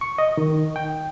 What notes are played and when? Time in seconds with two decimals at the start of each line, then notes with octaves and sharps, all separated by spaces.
0.01 C#6
0.18 D#5
0.37 D#3
0.76 G5